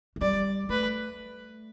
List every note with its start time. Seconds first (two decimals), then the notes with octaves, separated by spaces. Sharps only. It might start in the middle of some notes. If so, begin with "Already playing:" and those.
0.16 A3
0.21 G3 D5
0.69 A3 B4